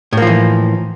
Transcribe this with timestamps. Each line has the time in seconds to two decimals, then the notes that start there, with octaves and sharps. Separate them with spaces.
0.13 A2
0.17 A#3
0.22 F3
0.27 E3